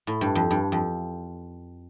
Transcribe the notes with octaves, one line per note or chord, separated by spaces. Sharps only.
A2
G2
F2
G2
F2